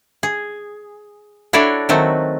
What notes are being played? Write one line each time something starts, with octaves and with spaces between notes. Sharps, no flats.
G#4
D4 E4 F#4 A4 C#5 D5
D#3 F#3 A3 C4 F#4